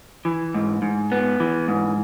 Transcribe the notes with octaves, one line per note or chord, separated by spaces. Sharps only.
E3
G#2
G#2
B3
E3
G#2